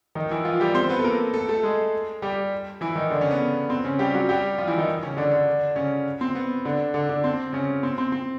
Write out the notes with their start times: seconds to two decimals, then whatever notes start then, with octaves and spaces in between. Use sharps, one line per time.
0.15 D#3 D#4
0.31 E3 E4
0.45 F3 F4
0.60 G3 G4
0.75 C4 C5
0.90 B3 B4
0.99 A4
1.04 A#3 A#4
1.34 A3 A4
1.49 A3 A4
1.63 G#3 G#4
2.22 G3 G4
2.81 E3 E4
2.96 D#3 D#4
3.10 D3 D4
3.21 C#3 C#4
3.31 B3
3.70 C4
3.84 C#3 C#4
3.99 G3 G4
4.14 F#3 F#4
4.29 G3 G4
4.58 F3 F4
4.67 E3 E4
4.78 D#3 D#4
5.03 C#3 C#4
5.17 D3 D4
5.31 D3 D4
5.76 C#3 C#4
6.21 C4
6.35 B3
6.65 D3 D4
6.94 D3 D4
7.09 D3 D4
7.24 C4
7.53 C#3 C#4
7.83 C4
7.98 C4
8.12 C4